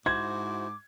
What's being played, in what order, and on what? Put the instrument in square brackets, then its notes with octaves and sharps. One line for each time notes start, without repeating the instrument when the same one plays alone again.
[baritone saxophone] G#2 [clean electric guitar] E4 F#4 C5 [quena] D6 [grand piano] G#6